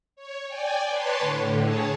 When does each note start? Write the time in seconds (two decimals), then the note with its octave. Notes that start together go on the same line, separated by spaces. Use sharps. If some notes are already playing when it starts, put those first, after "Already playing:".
0.16 C#5
0.48 D5 G5 G#5
0.88 B4 C#5 A5 C6 D6
1.19 A2 D3
1.62 G#4 C#5 A5